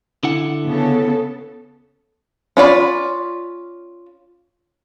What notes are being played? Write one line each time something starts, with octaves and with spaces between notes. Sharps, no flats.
D3 E4 F#5
C#3 B3 A4
C#4 F4 D5 B5